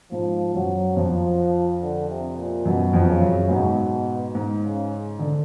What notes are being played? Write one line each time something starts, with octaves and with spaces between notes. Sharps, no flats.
G#2 F3
F#2 F#3
F2 F3
D3
C3
A#2
F#2 B2
F2
C#3
F#2
G#2 B2
G#2
C#3
D3